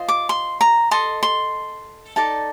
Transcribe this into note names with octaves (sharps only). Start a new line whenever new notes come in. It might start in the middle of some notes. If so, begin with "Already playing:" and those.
Already playing: F4 C5 D#5
D6
C6
A#5
A4 D#5 C6
C6
D#4 A4 D5 A5